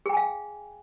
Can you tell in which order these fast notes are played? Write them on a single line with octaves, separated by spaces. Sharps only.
G#4 G5 G#5 F5